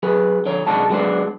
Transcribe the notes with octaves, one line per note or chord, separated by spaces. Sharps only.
F#3 G#4 B4
D3 F3 C#5
B1 G#3 D4 F#4 A5
F#3 G#3 B3 C#4 D4 C5